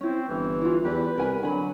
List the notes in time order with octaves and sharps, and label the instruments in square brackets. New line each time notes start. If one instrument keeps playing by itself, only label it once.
[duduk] C4 [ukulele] C#4 E4
[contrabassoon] G1 [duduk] E3
[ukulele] E4 F4
[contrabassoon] E2 [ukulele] G4 D5 [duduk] B4
[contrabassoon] C2 [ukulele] A#4 G#5 B5
[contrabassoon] D3 [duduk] F#3 [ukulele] G#5 B5